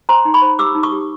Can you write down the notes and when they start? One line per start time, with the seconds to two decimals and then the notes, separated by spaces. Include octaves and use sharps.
0.09 C5 A#5 C6
0.25 D#4
0.34 B5 C#6
0.42 C5
0.59 G4 D6 E6
0.75 D#4
0.83 C#6 D#6
0.92 G4